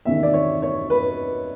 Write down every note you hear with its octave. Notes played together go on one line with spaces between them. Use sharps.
E2 C3 D#3 E5
D5
C#5
C#5
B4